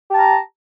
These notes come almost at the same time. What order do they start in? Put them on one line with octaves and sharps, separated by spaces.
G4 A5 A#5